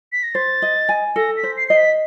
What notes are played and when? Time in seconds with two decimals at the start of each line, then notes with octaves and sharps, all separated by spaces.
0.12 B6
0.23 A#6
0.35 C5 A6
0.62 D#5
0.89 G#5
1.16 A4 A#6
1.37 B6
1.43 C5
1.57 C7
1.68 D#5 C7
1.77 B6